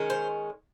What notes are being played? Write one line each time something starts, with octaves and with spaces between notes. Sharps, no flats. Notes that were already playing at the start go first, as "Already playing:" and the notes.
Already playing: D#3 G#3 C#4
C5